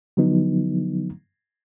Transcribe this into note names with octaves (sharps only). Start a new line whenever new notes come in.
D3 F3 F#3 B3 D#4